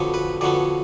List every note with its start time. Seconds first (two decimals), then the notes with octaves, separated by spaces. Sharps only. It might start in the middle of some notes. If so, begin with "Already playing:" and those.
Already playing: F2 D3 F#3 B3
0.14 B4
0.41 F2 D3 F#3 B3 D5